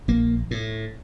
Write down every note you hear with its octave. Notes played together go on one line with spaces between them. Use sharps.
A#1 A#3
A2